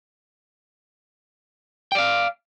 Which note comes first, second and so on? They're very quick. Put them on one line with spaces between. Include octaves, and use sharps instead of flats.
G5 D5 F5